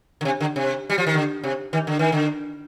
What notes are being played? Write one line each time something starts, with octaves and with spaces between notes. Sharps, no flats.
D3
C3
D3
C3
G3
F3
D#3
D3
C3
D#3
D3
D#3
D3